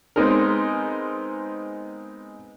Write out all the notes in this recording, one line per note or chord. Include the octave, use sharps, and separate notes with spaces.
G#3 B3 C4 D#4 G#4 A#4